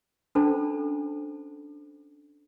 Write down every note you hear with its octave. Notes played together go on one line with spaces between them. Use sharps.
C#4 D4 F4 A4 C5 A5